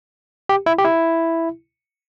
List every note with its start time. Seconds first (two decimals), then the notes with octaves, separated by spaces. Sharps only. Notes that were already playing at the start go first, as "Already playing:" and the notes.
0.49 G4
0.66 E4
0.78 G4
0.85 E4